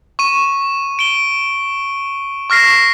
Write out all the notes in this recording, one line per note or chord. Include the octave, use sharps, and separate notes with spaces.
C#6 D#7
D7 G7
C#6 F6 A#6 C7